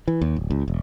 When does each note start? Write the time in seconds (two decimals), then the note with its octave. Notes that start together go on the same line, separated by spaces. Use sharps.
0.08 E3
0.22 D#2
0.36 D1
0.51 C#2
0.68 E1